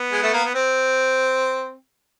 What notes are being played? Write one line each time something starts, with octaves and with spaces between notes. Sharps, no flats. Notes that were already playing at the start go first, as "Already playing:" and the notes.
Already playing: B3
G#3
A3
A#3
B3
C4